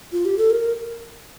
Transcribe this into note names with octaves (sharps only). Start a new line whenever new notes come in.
F4
G4
A4
A#4